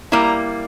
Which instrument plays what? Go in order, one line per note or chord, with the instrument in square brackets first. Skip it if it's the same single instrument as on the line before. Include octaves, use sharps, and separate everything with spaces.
[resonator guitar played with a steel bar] G3 A#3 E4 [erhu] A#5